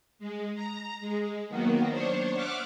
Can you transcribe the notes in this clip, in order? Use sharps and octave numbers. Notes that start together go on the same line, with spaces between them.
G#3
A#5
G#3
D#3 F#3 A#3 B3
D4 C5 C#5
E5 F#5 D6 F6 F#6